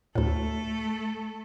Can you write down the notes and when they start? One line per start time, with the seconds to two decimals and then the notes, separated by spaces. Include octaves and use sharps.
0.15 D2 A2 A3 A4